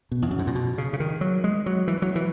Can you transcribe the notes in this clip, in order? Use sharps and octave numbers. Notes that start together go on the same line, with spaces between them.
B2
E2
F#2
G#2
A#2
B2
C#3
C#3
D#3
F#3
G#3
F#3
E3
F#3
E3